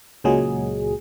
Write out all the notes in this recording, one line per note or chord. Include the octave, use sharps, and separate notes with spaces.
C#2 A#2 F#3 G#3 G#4